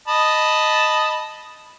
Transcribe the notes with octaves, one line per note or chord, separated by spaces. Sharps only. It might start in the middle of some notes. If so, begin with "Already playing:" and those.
D#5 A5 B5